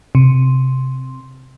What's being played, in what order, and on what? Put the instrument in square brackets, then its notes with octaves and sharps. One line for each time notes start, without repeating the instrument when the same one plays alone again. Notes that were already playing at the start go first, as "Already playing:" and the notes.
[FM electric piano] C3